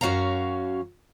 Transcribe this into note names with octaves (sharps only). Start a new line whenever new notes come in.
F#2 C#4 F#4 D#5 F5 A#5